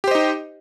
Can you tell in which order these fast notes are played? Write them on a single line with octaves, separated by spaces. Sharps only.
G4 C5 D#5 D#4